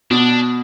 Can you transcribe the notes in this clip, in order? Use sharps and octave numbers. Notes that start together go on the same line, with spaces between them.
B2 D4